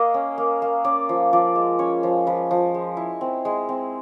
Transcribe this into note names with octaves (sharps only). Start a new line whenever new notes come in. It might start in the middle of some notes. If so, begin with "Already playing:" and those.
Already playing: A#3 D#5 F5
C#4
A#3
A#3
C#4 D5
F3
F3 D5
G#3
C#4 C#5
F3
F3 B4
F3
G#3
E4
C4
G#3
C4